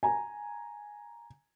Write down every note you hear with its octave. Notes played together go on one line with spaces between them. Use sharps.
G#5 A#5